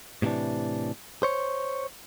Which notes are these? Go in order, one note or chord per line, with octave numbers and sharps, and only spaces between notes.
A2 C3 D#3 E3 D4
C5 C#5